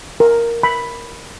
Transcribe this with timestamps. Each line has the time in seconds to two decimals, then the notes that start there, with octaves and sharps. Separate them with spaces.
0.20 A#4
0.63 B5